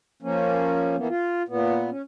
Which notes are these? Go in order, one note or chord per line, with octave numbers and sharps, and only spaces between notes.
F3 A#3 C#4
E3 A#3 B3
F4
A#2 B3
C#4